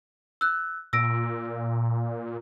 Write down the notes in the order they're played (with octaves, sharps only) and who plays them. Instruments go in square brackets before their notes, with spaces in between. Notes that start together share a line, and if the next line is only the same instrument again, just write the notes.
[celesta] E6 F#6
[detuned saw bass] A#2 [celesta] E6 A#6 D7